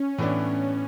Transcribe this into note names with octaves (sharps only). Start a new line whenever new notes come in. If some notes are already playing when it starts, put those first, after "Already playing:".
Already playing: C#4
A2 E3 B3 D4